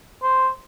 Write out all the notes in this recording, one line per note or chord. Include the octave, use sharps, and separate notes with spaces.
C5